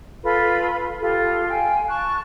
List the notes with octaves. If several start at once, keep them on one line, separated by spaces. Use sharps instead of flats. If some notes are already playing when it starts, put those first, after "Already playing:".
F4 A4 B4 B5
F4 G4 A4
F5 G5 G#5
A5 C#6 F#6